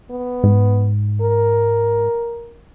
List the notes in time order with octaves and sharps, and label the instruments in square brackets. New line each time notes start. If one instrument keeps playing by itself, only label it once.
[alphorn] B3
[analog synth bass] G#2
[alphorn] A#4